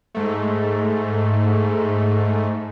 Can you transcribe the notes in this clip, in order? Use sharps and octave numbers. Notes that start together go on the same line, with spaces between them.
G#2 A3